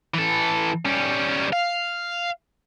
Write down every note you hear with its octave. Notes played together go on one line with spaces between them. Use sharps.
E3 A4
G3 C#4
F5